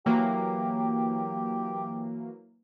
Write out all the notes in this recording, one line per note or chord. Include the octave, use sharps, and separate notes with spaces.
E3 F#3 A#3 G4